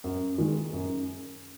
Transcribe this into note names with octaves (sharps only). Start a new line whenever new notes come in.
F#2
D#3 G#3
F#2